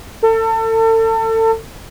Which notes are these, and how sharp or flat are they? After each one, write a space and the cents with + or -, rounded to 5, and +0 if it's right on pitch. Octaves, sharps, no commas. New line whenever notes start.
A4 +30